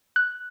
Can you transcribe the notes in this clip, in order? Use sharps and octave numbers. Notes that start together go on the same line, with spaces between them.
F#6